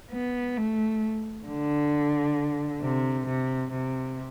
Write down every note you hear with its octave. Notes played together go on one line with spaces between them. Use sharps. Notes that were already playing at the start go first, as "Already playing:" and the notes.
B3
A3
D3
C3
C3
C3